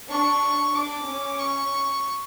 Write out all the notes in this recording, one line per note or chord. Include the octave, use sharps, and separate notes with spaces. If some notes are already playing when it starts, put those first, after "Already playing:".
D4 C#6
D4 D6
C#4
C#6